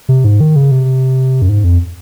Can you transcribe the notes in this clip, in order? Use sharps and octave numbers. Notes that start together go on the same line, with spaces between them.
C3
G#2
D#3
C#3
C3
F#2
G#2
F2